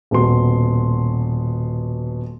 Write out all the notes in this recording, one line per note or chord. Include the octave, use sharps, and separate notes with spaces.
D#1 B2 C6